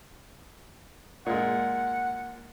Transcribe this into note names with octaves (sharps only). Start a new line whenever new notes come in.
A#2 G#3 F#5